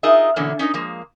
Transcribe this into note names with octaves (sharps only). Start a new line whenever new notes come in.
D#4 F4 G#4 A#4 D#5 E5
B2 D3 E3 A#3 C#4
C#4 D#4 A#4 D#5
F3 G#3 A#3